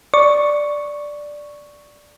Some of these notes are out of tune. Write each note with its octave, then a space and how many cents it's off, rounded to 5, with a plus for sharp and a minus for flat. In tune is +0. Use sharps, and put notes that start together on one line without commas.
D5 +0 C#6 +0